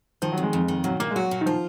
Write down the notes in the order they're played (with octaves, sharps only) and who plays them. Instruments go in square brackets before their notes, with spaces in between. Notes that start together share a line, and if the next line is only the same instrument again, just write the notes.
[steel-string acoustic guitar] D#3 [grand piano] F3
[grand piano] F#3
[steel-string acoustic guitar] F2
[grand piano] G#3
[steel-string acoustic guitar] F2
D#3
[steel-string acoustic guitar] A#2 [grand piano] F#3
[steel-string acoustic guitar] A#2 [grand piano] A#3
[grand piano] G#3
[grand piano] F#3 [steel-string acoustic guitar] F#4
[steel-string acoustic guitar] A#2
[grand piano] D#3
[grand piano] F3 [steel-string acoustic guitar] F4